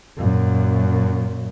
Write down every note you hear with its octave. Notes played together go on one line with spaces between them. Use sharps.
F#2 A#2